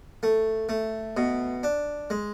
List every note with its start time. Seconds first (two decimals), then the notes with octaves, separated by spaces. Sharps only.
0.23 A3
0.69 A3
1.17 B2
1.63 D4
2.10 G#3